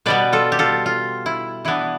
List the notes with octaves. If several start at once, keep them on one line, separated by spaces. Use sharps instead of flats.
B2 G3 B3 B4 D5
F4 A4
G4
F4 A4
F4
E4
E3 B3 D4 E4